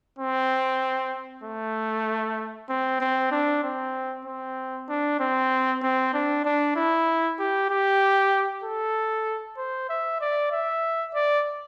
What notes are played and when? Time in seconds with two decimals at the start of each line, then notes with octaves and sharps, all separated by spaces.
0.19 C4
1.43 A3
2.69 C4
3.00 C4
3.32 D4
3.63 C4
4.25 C4
4.89 D4
5.20 C4
5.82 C4
6.14 D4
6.45 D4
6.76 E4
7.39 G4
7.70 G4
8.64 A4
9.58 C5
9.90 E5
10.21 D5
10.52 E5
11.14 D5